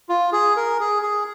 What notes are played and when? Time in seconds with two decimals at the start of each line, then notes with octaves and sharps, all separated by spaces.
0.09 F4
0.33 G#4
0.56 A#4
0.80 G#4
1.02 G#4